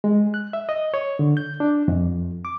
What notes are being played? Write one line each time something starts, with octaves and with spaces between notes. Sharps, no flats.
G#3
F#6
E5
D#5
C#5
D3
G6
D4
F2
D6